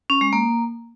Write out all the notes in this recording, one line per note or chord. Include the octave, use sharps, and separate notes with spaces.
C#4
G#3
A#3